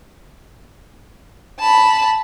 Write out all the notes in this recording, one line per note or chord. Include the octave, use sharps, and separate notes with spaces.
A5 B5